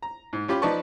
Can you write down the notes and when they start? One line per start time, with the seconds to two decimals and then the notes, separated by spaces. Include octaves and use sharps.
0.02 A#5
0.33 G#2
0.48 C#4 F4 G4 B5 D6
0.62 F3 D#4 B4 D5 A5 C#6